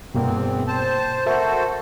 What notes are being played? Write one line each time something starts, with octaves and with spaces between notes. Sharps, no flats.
E2 G2 B2 A#3 C4
C5 A5
F#4 A4 A#4 C5 E5 A5